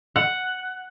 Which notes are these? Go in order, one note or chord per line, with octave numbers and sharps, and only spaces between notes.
F#5